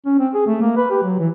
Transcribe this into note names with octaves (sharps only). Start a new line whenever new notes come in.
C#4
C4
G#4
A3
A#3
B4
G4
F#3
E3